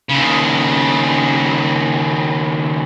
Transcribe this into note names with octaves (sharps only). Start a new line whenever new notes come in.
D#2 C#3